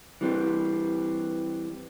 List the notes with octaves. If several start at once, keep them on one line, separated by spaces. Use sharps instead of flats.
E3 G3 C4